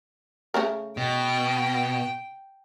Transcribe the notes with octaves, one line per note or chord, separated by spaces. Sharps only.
C#3 A3 A#4
B2 G5